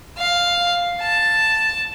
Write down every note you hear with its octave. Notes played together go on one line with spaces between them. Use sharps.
F5
A5